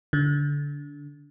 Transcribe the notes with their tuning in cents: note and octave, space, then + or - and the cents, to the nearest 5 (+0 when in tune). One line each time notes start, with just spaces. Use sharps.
D3 -25